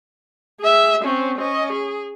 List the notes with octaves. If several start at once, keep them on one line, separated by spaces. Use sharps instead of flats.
G#4 E5
C4 C#4
C#4 D#5
G#4